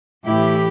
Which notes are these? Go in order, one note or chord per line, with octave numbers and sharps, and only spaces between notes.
A2 E3 E4 G4